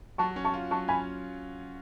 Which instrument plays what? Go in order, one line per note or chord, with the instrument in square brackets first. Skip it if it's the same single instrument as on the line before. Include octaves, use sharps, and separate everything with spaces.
[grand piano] F#3 [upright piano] A5 C#6
[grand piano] C#4
[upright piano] A5 C#6
[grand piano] F4
[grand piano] F#3 [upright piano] A5 C#6
[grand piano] C#4 [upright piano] G#5 B5